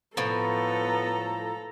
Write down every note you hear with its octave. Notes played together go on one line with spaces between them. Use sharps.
A2 F3 B3 A4 A#5